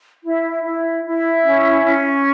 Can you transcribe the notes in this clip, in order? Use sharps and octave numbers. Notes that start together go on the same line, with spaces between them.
E4
E4
E4
C#4
C#4